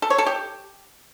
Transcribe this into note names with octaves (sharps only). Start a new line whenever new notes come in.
A4
C#5
A4
G4